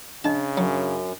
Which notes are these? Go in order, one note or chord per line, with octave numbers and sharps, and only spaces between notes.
C#3 D4 D#5 A5
F#2 F#3